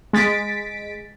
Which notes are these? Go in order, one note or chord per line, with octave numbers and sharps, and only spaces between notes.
G#3 A6 B6 D7